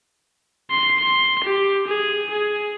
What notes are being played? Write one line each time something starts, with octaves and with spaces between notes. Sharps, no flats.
C6
C6
G4
G#4
G#4